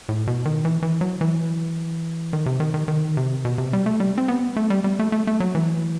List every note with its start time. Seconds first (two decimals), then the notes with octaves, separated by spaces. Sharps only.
0.09 A2
0.27 B2
0.45 D#3
0.65 E3
0.82 E3
1.01 F#3
1.21 E3
2.33 D#3
2.46 C3
2.60 D#3
2.74 D#3
2.88 D#3
3.17 C3
3.45 B2
3.58 C3
3.73 G3
3.86 A3
4.00 G3
4.18 C4
4.28 B3
4.56 A3
4.70 G3
4.84 G3
4.99 A3
5.12 A3
5.27 A3
5.40 F#3
5.55 E3